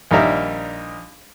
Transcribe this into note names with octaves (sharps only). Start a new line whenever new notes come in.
A#1 D#3 G3 D#4 A#4 E5